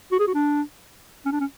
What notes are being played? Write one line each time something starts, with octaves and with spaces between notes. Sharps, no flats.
F#4
G#4
F#4
D4
C#4
D4
C#4